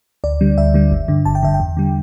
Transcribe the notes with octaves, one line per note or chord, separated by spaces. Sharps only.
D2 D5
D3 G3
D2 E5
D3 G3
G1
G2 D3
G1 A5
G5
G2 D3 E5
G5
E2
D3 G3